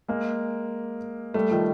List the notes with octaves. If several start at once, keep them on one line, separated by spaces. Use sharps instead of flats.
G#3 A#3
G3 A3
D#3 F3